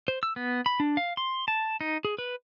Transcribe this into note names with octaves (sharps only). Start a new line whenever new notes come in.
C5
E6
B3
B5
D4
F5
C6
A5
D#4
G#4
B4